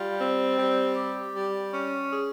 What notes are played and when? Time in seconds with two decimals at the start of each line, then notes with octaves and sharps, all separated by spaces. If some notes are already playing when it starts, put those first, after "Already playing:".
Already playing: G3 F4
0.19 C4
0.58 G3
0.95 G4
1.34 G3
1.71 C#4
2.10 G#4